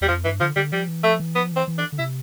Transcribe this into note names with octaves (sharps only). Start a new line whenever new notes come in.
E2 G3
F2 F3
G2 E3
D3 F3
D3 G3
F3 G3
E3
F3 A3
E3
F3 B3
E3 C4
E3
D4
D3
C3 E4